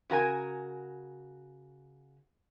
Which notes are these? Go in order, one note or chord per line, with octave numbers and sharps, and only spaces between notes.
C#3 F#4 A#4 G#5